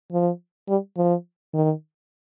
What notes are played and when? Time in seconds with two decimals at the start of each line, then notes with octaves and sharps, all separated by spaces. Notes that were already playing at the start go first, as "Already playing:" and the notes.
0.12 F3
0.69 G3
0.97 F3
1.54 D#3